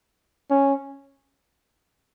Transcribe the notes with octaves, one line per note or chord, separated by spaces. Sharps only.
C#4